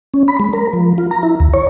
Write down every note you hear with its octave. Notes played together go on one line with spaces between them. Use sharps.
C#4
B5
G#3
A#4
F3
F4
A#5
E4
D#2
C#5